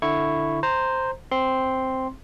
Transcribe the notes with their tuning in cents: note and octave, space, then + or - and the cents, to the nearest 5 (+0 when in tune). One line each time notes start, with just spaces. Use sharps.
D3 +10 E4 +0 C#6 +0
C5 +0 A#5 -10
C4 +0 C6 +0